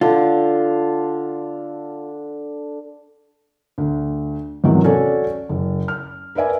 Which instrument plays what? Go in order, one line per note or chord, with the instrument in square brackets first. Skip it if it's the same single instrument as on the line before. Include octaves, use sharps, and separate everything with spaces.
[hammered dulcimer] D3 [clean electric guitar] F4
[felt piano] D2
E2 G#2 C3 D#3 F#3 C#4
C#4 F#4 A4 C#5 D5 G#5
F#1
F6
A#4 B4 D5 E5 G#5